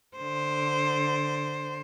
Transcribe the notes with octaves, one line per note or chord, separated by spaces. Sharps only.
D3 C5